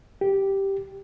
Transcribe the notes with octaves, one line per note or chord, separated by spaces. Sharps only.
G4